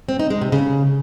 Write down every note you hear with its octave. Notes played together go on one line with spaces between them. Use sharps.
C4
D#4
G#3
C3
C#3